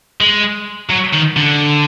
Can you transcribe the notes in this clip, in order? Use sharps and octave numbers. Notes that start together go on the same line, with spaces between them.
G#3
F#3
D#3
D3